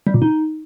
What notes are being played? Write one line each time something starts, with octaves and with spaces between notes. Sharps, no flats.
G3
A#2
D#4